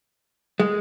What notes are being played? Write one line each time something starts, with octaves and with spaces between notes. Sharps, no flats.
G#3